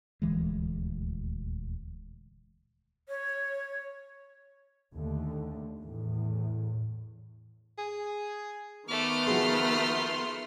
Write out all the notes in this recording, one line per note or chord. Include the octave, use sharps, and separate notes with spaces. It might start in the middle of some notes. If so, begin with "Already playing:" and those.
D#1 D2 E3 G#3
C#5
D#2 D3 A3
E2 A2
G#4
D#3 A3 B3 D6 F6
F3 F#4 G#4 C6